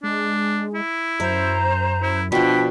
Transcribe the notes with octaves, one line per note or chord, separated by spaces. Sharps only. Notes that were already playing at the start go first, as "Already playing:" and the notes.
G#3 D4
E4
F#2 C5 E5 A#5
E4
B2 F3 D4 G5 B5